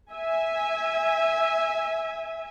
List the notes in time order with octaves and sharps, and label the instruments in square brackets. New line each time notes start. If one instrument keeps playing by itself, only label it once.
[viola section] E5 G#5